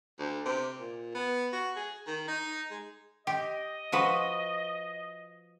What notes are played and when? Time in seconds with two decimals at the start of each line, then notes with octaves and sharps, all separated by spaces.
0.19 D2
0.45 C3
0.80 A#2
1.15 B3
1.53 F#4
1.76 G#4
2.06 D#3
2.28 D#4
2.71 G#3
3.27 G4 D#5
3.92 F3 F#4 B4